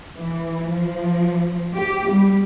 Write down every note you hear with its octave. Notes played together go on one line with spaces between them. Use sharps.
E3
F3
G4
G3